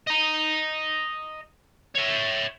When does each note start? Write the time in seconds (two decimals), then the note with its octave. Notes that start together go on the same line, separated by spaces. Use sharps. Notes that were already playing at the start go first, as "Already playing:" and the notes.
0.07 D#5 A#5
1.95 C#5 E5